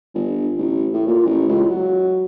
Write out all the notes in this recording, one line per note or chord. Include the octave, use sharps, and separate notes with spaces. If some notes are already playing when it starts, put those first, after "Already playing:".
G1
A1
A2
A#2
A1
C#2
F#3